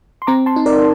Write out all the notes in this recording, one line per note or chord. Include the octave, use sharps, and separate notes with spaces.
C6
C4 A#5 D6
A5 C6
D#4
A#4 D5